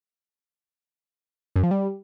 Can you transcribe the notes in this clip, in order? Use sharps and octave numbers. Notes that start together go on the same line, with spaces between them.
F#2
F3
G3